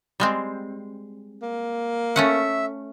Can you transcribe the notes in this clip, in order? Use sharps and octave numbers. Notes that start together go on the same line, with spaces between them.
G3 G#3 C4
A#3
A3 C#4 E5 F#5